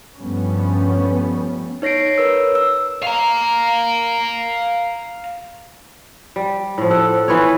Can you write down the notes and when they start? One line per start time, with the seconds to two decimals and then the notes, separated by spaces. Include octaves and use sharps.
0.18 G2 F3 G3 A3 B3 C#4
1.82 D#4 C#5 A#6 C7 D7
2.18 A#4 B4 C#5 E6
2.55 E6
3.03 F5 A#5
6.36 G3
6.78 A2 F3
6.90 A4 F#5
7.28 E3 B3 F4 C#5